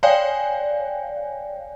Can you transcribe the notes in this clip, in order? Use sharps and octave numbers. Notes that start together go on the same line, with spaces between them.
C#5 D5 F5 G5 G#5